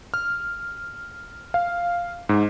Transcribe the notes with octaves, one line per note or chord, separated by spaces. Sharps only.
F6
F5
G#2